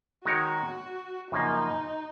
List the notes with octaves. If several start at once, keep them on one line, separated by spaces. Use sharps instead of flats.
D#3 G#3 D#4 F#4 A#4 C#5
F#2 C#3 F3 A#3 D#4